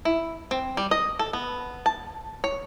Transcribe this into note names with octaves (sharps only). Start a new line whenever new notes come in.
E4
C4
G3
D#5
A4
B3
A5
C#5